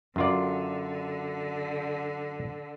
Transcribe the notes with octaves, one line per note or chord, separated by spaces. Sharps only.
F#2 D3 F4 D5